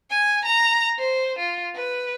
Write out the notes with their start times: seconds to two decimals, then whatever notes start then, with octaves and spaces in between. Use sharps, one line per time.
0.11 G#5
0.45 A#5
0.98 C5
1.39 F4
1.75 B4